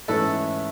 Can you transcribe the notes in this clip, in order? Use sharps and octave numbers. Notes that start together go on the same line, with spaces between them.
G#2 E3 A3 C#4 E4 A4 B4